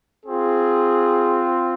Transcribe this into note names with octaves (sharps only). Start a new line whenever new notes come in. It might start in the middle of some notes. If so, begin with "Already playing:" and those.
C4 F4 G#4